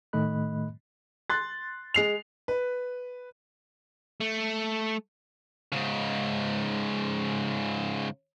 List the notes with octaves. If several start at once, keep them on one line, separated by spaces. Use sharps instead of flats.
A2 D#3 A3 D#5 B5 F#6
C6 F#6 A6
G#3 C7 F7
B4
A3
G#2 C#3